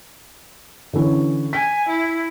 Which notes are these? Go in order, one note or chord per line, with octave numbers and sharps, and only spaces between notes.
D3 E3 C#4
G#5 B6
E4